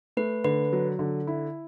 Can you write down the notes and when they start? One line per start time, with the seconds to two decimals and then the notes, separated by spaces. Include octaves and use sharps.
0.17 A3 B4
0.44 D3 B4
0.73 F#3
0.99 D3
1.27 E4